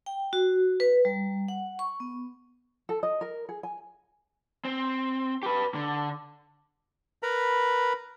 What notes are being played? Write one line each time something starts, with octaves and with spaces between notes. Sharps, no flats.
G5
F#4
B4
G3
F#5
C#6
B3
A4
D#5
A#4
G#4
G#5
C4
G4 B4
D3
A#4 B4 A#5 B5